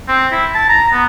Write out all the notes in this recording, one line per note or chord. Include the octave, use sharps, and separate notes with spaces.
C4
E4
A5
A#5
B3